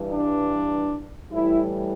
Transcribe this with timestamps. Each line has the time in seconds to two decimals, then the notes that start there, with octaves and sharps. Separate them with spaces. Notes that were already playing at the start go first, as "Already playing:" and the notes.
Already playing: G2 E3 G3
0.08 D4
1.30 A2 E3 G3 E4